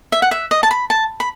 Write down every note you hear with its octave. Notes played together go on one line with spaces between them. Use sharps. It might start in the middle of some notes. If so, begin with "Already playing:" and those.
E5
F#5
E5
D#5
A5
B5
A5
B5